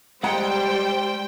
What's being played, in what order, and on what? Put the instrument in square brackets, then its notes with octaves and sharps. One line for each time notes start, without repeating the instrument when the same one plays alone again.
[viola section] G3 C5 [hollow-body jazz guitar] G#3 F#5 A#5 [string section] G5